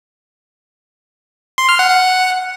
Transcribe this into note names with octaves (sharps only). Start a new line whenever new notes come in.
C6
F6
F#5
F#5